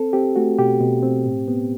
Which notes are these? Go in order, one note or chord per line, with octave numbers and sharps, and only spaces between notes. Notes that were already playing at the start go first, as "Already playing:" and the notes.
Already playing: C4 A4
C4 G4
A3 F#4
B2 G4
B2
C4
A2
B3